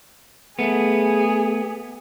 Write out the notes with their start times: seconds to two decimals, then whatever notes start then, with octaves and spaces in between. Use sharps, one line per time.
0.59 A3 B3 G#4